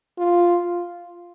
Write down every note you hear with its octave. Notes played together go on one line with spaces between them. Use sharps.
F4